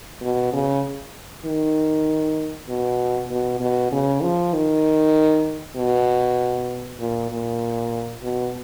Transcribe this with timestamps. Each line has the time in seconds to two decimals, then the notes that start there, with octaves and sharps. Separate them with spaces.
0.22 B2
0.53 C#3
1.46 D#3
2.69 B2
3.31 B2
3.60 B2
3.92 C#3
4.23 F3
4.54 D#3
5.76 B2
7.00 A#2
7.31 A#2
8.22 B2